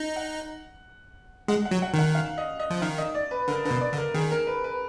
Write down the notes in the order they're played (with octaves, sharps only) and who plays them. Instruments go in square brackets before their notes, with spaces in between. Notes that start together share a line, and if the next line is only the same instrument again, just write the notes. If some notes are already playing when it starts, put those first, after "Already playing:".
Already playing: [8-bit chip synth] D#4
[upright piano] F#5
[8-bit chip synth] G#3 [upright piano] F#5
[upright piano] F#5
[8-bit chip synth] F#3
[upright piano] F#5
[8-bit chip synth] D#3 [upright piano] F#5
[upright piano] F5
D#5
D#5
[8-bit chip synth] F3
[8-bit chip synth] D#3 [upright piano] F5
[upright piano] D#5
D5
B4
[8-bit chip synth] D3 [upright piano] A#4
[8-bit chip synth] D3 [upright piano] B4
[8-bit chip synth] B2
[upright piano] D5
[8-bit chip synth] D3
[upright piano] A#4
[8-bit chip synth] D#3 [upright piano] G#4
[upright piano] A#4
B4
B4